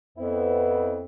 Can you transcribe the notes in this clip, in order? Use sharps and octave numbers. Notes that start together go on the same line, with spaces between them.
F2 B3 C4 E4